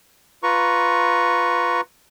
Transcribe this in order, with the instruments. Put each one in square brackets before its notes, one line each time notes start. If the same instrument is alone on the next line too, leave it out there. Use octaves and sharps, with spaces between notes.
[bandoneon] F4 B4 A#5 C#6